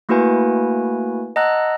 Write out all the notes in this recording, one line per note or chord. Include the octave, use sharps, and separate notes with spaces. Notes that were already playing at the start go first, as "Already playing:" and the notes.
A3 A#3 E4 F#4 B4 G#5
D#5 F#5 A5 A#5 E6 F#6